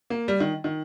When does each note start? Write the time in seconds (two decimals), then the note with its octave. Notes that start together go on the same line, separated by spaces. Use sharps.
0.10 A#3
0.28 G3
0.40 D#3
0.64 D#3